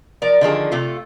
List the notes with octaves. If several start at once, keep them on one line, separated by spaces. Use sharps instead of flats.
F3 A#4 D5
D3 D#3 F3 G#4
C3 A3 F4